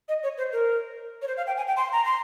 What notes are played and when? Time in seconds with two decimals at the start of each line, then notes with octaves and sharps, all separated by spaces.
0.09 D#5
0.23 C#5
0.38 C5
0.52 A#4
1.22 C#5
1.28 C5
1.37 F5
1.47 G5
1.57 G#5
1.67 G5
1.77 C6
1.92 A#5
2.05 C6